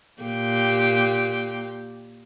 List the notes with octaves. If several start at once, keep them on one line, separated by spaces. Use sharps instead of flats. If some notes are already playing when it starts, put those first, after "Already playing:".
A#2 G4